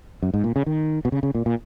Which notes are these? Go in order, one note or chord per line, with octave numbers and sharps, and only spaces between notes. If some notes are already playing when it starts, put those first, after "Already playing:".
F#2
G#2
A#2
C#3
D#3
B2
C#3
C#3
A#2
A#2